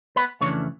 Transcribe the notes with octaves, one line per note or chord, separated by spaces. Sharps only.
B3 B4
F2 C#3 E3 A3 D4 C#5